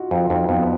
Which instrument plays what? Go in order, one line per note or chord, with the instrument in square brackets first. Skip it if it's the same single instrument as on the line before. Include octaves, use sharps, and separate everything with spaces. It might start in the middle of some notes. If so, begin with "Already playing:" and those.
Already playing: [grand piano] D#4 F4 F#4
[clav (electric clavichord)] F2 [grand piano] F4
[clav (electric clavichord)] F2 [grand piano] D#4
[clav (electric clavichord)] F2 [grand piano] B3